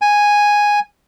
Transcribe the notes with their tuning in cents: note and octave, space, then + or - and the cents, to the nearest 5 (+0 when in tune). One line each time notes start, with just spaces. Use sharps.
G#5 -5